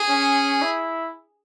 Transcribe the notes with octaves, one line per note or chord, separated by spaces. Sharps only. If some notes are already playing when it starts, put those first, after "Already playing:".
Already playing: G#4
C#4
E4